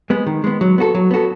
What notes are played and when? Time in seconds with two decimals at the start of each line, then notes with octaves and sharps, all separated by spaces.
0.10 G#3 B3
0.26 D#3
0.44 G#3 B3
0.61 F#3
0.78 B3 F#4 A4
0.95 F#3
1.11 B3 F#4 A4